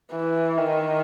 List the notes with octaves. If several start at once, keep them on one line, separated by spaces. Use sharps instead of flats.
E3
D#3